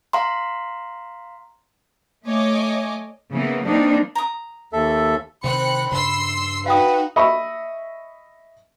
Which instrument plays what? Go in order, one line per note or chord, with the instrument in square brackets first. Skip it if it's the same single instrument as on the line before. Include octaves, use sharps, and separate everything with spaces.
[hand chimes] F5 A#5 C6
[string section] A3 C#5 D#5 G#5 D6
[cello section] C#3 E3 A#3 B3
E3 G3 A#3 C4 D4 D#4
[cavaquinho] A#5 D#6
[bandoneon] D#2 A4 E5
[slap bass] C3 D#3 [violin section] C4 F#6 C#7 [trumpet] B5
[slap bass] G2 C#3 [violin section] C6 E6 C7
[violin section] D#4 F#4 [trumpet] B4 [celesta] F5 G5 D#6
[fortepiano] D#5 E5 B5 C#6